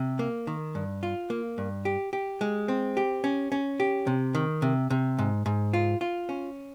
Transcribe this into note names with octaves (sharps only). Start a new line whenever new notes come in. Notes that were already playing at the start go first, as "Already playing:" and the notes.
Already playing: C3
A#3
D#3
G2
F4
A#3
G2
G4
G4
G#3
C4
G4
C#4
C#4
G4
C3
D#3
C3
C3
G#2
G#2
F4
F4
C#4